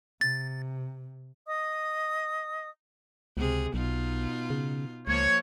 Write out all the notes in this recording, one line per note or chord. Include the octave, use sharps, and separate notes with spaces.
C3 A6
D#5 D#6
C#2 C3 G#4
B1 B2 D#4 F4
C#3
C#2 F3 A#3 C#5